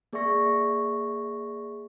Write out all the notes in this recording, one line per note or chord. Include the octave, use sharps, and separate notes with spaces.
A#3 G#4 D5 E5 C#6 A#6